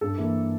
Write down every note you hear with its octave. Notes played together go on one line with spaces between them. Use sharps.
G2 A4
E3 A#3